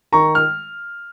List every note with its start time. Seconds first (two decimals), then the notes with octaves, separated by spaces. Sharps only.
0.12 D#3 A#5 C#6
0.35 F6